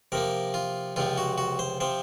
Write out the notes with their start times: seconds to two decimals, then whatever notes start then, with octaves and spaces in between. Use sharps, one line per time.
0.12 C3 F3 A#3 A#4
0.54 F4
0.96 C#2 C3 F3 F4
1.18 F#4
1.38 F#4
1.59 C5
1.80 C3 F3 C5